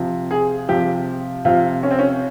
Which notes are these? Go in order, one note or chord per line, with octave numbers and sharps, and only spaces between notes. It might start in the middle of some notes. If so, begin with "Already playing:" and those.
Already playing: C3 F3
G#4
C3 F3 G4
C3 F3 F4
C#4
C4
C#4